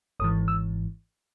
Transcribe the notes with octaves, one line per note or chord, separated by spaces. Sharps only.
G#1 G#2 E3 D#6
E6